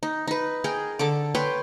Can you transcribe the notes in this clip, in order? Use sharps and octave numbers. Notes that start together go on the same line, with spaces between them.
D#4
D#4 B4
G#4 A#4 G5
D3 A4 D6
B4 C#5 G5 C6